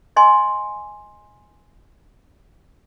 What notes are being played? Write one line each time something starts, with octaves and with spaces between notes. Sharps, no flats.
D#5 G#5 C6